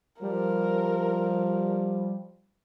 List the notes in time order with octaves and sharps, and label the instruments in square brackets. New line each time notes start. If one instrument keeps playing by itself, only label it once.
[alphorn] F3 [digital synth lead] G3 [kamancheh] A#4